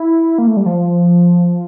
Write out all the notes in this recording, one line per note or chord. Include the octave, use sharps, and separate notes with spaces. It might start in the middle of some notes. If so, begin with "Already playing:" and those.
Already playing: E4
A#3
A3
G3
F3